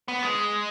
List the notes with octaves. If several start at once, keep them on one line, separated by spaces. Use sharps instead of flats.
B3
G#3